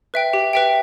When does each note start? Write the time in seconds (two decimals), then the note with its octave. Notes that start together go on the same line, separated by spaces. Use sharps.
0.14 B4 E5 G5
0.33 G4
0.53 B4 E5 G5